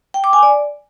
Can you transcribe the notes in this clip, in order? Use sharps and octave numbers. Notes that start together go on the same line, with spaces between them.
G5
D6
G#5
D5